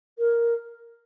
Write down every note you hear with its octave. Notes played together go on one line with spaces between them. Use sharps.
A#4